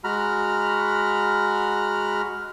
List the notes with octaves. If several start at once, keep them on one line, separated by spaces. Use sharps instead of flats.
G#3 F#4 A#5 B5 F6